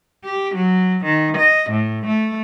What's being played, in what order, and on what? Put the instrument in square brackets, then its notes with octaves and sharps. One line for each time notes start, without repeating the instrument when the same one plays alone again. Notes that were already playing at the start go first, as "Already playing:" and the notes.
[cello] G4
F#3
D#3
D#5
A2
A3